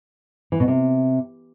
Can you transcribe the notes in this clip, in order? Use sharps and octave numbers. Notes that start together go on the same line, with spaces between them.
E3
B2
C3